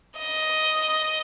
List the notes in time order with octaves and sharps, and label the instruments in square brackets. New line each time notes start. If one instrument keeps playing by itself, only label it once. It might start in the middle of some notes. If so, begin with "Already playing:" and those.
[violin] D#5